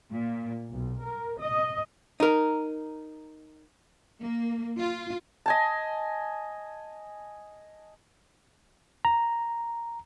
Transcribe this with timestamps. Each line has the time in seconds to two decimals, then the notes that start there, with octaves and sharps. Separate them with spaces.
0.10 A#2
0.71 B1
1.02 A#4
1.39 D#5
2.20 D#4 A#4
4.21 A#3
4.77 F4
5.46 D#5 G#5 A5
9.05 A#5